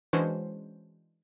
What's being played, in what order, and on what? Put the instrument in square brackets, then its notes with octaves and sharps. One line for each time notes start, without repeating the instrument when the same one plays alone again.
[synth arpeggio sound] E3 G#3 C#4 D4 F#4 C5